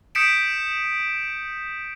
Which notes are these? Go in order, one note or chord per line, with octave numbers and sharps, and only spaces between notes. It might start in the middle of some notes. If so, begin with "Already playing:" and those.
D#6 G6 B6 C#7 D7 E7